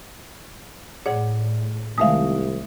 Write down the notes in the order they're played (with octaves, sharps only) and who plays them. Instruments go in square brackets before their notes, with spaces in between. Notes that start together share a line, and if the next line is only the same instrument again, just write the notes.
[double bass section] A2 [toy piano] G#4 D5 [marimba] C#5 F#5
[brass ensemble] C2 [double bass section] D#3 [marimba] G#3 A3 F5 [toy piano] E5 D#6